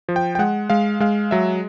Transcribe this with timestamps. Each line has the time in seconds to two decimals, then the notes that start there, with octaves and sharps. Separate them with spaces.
0.09 F3
0.16 G5
0.35 G5
0.39 G#3 F#5
0.70 G#3 F5
1.00 G#3 F5
1.31 F#3 E5